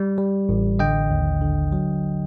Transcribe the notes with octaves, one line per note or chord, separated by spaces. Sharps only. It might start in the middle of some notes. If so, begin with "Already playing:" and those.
Already playing: G3
G3
A1
D3 D#5 G5
D#2
D3
F#3